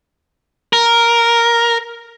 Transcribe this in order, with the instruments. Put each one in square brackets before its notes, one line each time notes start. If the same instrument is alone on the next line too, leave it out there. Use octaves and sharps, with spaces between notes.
[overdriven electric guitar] A#4